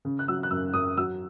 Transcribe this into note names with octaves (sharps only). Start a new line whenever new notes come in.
C#3
F#6
F#3 E6
F#6
F#2 E6
F#2 D#6
F#3 E6